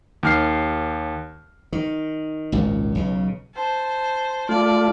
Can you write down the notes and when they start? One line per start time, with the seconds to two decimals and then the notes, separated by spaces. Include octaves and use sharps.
0.23 D#2 F6 C7
1.73 D#3
2.52 G#1 C#2 A#2
2.95 B1 C#3
3.55 C5 A5
4.49 A3 F4 D5